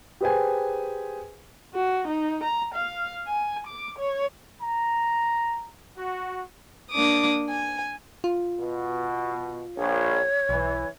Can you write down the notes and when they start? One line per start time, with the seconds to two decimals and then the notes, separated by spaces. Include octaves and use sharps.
0.21 G4 G#4 B4 C5 G5 G#5
1.74 F#4
2.08 D#4
2.44 A#5
2.74 F5
3.28 G#5
3.67 D6
3.99 C#5
4.61 A#5
5.97 F#4
6.91 A#3 D4 D6 D#6
7.49 G#5
8.24 F4
8.60 B2
9.77 A#1 C#5
10.49 B1 E3